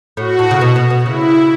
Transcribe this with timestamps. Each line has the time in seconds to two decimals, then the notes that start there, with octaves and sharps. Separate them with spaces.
0.17 A2 F#4
0.39 A2
0.51 C#3
0.61 B2
0.76 B2
0.90 B2
1.06 C#3 E4